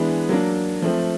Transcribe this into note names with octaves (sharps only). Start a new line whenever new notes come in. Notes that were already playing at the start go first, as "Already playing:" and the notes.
Already playing: E3 G#3 B3 D4
F#3 A#3 D4
F3 A3 C4